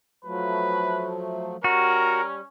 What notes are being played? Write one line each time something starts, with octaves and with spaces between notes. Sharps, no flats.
F3 F#3 A3 B4
G3 C#4 F#4 A#4